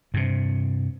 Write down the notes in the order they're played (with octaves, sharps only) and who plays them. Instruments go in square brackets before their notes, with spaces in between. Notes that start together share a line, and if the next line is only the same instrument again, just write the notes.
[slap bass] G2 C3